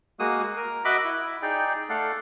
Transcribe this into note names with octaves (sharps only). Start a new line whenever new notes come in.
G#3 A#3 F#4 D#6
A#4
F#4 D#5 E5 F#5 B5 D6
E4
D#4 G#4 D5 G5
A3 A4 D5 F5 F#5